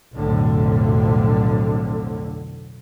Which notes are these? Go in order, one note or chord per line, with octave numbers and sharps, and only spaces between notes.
B1 F2 A2 D3